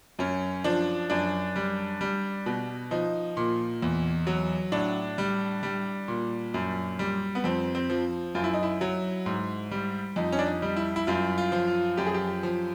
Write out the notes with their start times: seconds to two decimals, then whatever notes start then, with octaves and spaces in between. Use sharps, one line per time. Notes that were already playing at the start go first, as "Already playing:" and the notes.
0.19 F#2 C#4
0.64 F3 D4
1.10 F#2 D4
1.56 G3
2.01 G3
2.46 B2
2.91 F3 D#4
3.37 A#2
3.82 E2
4.27 F#3
4.72 A2 D4
5.18 G3
5.63 G3
6.08 A#2
6.54 F#2
6.99 G3
7.35 B3
7.44 F2 C4
7.75 C4
7.90 F3
8.35 F#2 F4
8.44 E4
8.54 D#4
8.63 E4
8.81 F#3
9.26 G#2
9.71 G3
10.16 F2 D#4
10.32 C#4
10.39 D4
10.46 D#4
10.62 G3
10.76 E4
10.96 E4
11.07 F#2 F4
11.38 F4
11.52 F3
11.67 F4
11.97 F#2 G4
12.06 G#4
12.14 G4
12.43 F3